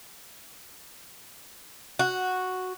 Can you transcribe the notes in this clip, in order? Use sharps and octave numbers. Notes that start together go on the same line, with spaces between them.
F#4